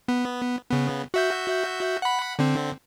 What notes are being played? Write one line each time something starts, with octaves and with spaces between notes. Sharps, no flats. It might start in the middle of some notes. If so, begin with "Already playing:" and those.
B3
C#3 B3
F#4 E5 G6
F#5 B5
D3 C4